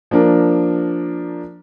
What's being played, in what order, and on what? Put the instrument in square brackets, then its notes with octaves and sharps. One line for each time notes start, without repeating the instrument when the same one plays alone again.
[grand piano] F3 A#3 D4 A#4